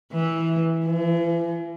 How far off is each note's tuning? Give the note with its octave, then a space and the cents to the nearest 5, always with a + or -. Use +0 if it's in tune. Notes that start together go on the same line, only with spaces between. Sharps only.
E3 -10
E3 +45